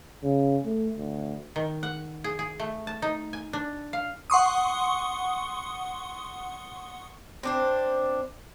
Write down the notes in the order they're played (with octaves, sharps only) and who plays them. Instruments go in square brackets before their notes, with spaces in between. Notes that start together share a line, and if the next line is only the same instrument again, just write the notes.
[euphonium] C#3
A3
D2
[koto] D#3
F#5
G#4
G#4
A3
A5
D#4
G#5
D4
F5
[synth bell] F#5 C6 C#6 D#6
[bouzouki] C4 D4 C5